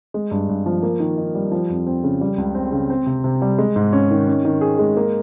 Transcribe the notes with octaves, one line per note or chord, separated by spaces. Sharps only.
G#3
G2
G2
F3
A#3
D#3
D#4
G3
F3
F2
C4
C#3
G3
C#2
C4
C#3
C4
C3
C3
G3
G#3
G#2
C#4
D#3
C#4
D#3
G#4
G#3
A#3